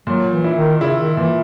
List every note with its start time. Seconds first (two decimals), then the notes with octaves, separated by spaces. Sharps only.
0.07 A#2 F#3
0.32 E3
0.44 E4
0.56 D#3
0.81 C#3 E4
0.99 D#3
1.17 A#2 E3